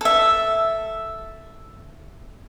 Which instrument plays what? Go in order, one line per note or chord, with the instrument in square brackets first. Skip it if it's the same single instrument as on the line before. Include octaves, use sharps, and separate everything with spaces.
[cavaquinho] A4 E5